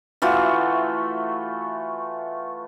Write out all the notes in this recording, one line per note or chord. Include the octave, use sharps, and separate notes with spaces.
E3 A3 F4 F#4